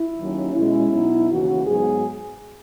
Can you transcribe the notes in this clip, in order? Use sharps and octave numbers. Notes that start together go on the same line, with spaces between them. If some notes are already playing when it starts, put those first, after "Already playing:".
Already playing: E4
D#2 D#3 F#3 C#4
B2 G#3 C#4 E4
B2 F#3 B3 D#4
D#2 C#3 E3 F#4
G#2 F#3 B3 G#4